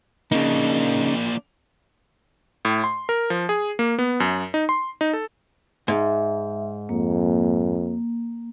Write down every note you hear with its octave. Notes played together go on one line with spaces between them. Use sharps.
C#3 A#3 D4 D#4
A2
C6
A#4
F3
G#4
A#3
B3
F#2
D#4
C6
D#4
A4
G#2 E5
F2 A#3